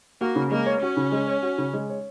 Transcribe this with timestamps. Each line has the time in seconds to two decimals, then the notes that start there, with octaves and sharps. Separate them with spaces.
0.21 A#3 F#4
0.36 C#3
0.51 G#3 A#3
0.66 C#5
0.82 C#4 F#4
0.97 C#3
1.12 G#3
1.27 C#5
1.42 F#4
1.58 C#3
1.73 G#3
1.90 C#5